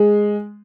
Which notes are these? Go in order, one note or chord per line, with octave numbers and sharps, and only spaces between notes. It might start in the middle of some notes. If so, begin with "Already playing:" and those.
Already playing: G#3